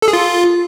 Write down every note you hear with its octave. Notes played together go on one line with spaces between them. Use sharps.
A4
G#4
F4